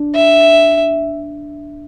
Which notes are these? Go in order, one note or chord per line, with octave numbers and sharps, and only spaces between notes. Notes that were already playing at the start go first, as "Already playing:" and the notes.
Already playing: D4
E5